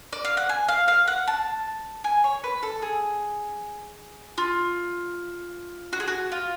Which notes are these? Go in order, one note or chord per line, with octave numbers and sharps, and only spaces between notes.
D5
F5
F#5
G#5
F5
F5
F#5
A5
G#5
C#5
B4
A4
G#4
F4
F#4
G#4
F#4
F4